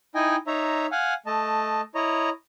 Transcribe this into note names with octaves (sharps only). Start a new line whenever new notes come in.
D#4 E4 D#5 G5 G#5
D#4 C#5 E5 A#5
F5 F#5 G#5
A3 D#5 A5
E4 C#5 D#5 A#5